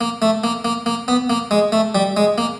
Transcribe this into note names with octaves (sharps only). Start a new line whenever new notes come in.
A#3
A3
A#3
A#3
A#3
B3
A#3
G#3
A3
G3
G#3
A#3